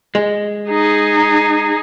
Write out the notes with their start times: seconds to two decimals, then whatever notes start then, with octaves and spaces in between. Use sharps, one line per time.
0.15 G#3
0.69 D#4 G#4